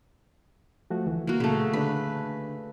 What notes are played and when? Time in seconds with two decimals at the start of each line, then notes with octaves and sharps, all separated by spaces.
0.90 F3 A3 F#4
1.06 D2 E3
1.27 A#3 F#4
1.40 A#2 C#3 A3
1.73 D3 D4 B4